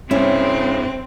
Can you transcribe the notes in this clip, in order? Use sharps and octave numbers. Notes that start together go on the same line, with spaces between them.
G2 C4 C#4 E4